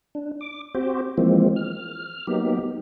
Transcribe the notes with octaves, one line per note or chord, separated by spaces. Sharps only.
D4
D6
C4 F#4 G4 C5
E3 F3 G#3 A#3 C4
F6
F#3 A#3 B3 D#4 G4